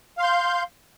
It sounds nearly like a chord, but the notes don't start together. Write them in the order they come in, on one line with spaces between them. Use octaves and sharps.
F5 C6 G6